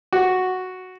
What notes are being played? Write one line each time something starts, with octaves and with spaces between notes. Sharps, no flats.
F#4